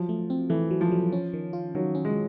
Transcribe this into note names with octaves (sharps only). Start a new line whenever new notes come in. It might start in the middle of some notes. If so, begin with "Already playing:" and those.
Already playing: F3 F#3
A3
C4
E3 A3
F#3
F3
F#3
C#4
D#3
F4
D#3 F#3
C#4
G#3